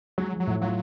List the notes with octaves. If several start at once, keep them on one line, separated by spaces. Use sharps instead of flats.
F#3 G#3
F3
F#3
A2
F#3 F4